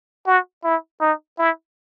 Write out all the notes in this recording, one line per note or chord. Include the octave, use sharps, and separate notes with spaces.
F#4
E4
D#4
E4